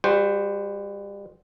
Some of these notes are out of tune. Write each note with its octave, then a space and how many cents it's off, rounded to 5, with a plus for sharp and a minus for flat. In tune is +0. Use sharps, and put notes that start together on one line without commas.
G3 +35 F#4 +0 C5 +0